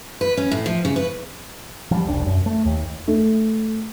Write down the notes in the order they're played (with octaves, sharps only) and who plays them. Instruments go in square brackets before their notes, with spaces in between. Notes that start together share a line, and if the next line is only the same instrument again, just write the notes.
[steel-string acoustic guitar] B4
C#4
A2
F3
C#3
B4
[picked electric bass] F3 G3
E1 C2 D4
F#2
A3
D#2
[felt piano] A3